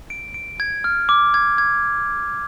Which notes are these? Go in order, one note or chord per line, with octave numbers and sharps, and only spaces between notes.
D7
D7
G#6
F6
D6
G#6
G#6